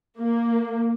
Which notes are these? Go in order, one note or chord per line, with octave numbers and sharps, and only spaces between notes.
A#3